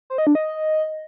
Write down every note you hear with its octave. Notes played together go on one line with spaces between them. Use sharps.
C5
D#5
D4
D#5